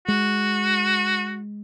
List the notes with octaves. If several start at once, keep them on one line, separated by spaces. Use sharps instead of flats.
G#3 F#4